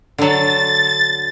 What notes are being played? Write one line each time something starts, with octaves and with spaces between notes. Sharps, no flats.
D3 F#3 A6